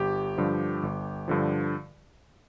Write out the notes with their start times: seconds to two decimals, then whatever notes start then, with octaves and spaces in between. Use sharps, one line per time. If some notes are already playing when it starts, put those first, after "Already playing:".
Already playing: G1 G4
0.38 G2 D3 F3
0.83 G1
1.28 G2 D3 F3